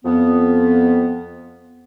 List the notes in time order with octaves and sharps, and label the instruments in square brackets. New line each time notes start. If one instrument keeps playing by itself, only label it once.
[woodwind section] F2 B3